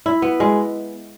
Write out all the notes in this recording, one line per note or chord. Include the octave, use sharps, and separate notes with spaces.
E4
B3
G#3